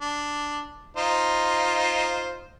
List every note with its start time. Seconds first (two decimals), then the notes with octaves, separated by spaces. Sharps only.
0.01 D4
0.97 D#4 F4 C5